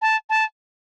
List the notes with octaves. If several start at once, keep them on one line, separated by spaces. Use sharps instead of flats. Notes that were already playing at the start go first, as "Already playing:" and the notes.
A5
A5